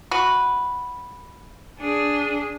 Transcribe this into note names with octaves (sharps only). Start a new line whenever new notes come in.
F#4 B4
D4 G#4